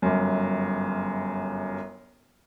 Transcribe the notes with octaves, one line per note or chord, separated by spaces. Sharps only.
G1 F#2